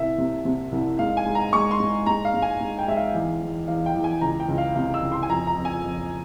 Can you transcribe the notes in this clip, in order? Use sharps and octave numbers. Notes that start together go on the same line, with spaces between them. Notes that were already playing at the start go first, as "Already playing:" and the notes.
Already playing: C2 E5
C3
C3
C2
G#2 F5
G#5
G#2
A#5
G#3 C#6
C6
G#2
G#2 A#5
F5
G#2
G#5
G#2
G5
G#2 E5
F5
E2
E2
E2 F5
G5
E2
G#5
C#2 A#5
G5
C#2
F5
C3 F5
E6
C#2
C6
G#5
F2 A#5
A#5
F2
G#5
F2